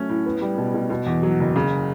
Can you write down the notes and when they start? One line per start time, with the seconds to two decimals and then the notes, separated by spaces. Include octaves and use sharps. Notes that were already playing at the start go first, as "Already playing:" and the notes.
Already playing: F#3 A3 C#4
0.09 A2
0.26 B3
0.42 G3
0.58 B2
0.74 B2
0.90 B2
1.06 E2
1.23 F#3
1.40 F#1
1.56 C#3